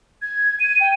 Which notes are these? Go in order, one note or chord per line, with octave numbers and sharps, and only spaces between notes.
G#6
D#7
G5